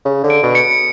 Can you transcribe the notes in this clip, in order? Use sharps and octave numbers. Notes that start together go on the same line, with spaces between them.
C#3
D3
D7
B2
C#7